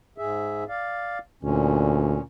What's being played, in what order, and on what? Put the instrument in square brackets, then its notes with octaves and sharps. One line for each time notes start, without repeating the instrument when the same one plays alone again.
[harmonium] G#2 G#4 E5
D5 F5
[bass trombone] D2 [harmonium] A#2 C#4